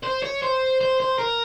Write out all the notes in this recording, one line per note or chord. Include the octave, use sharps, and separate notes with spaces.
C5
C#5
C5
C5
C5
A#4